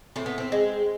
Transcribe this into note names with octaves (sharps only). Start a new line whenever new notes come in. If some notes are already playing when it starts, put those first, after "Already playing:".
A2 C4
B3
C4
G#3